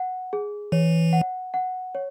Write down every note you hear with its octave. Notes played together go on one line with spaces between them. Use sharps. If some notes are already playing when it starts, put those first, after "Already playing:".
Already playing: F#5
G#4
E3 C#5
F#5
F#5
C#5